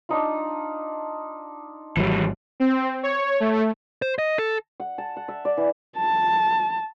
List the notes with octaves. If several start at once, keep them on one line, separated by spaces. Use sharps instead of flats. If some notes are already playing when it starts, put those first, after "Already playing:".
D4 D#4 F4
G#1 E3 F#3 G3
C4
C#5
A3
C5
D#5
A4
F#5
A5
F#5
E5
D5
E3
A5